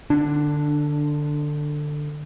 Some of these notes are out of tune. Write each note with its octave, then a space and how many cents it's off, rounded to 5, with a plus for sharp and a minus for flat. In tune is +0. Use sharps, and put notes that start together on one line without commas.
D3 +20 D4 +0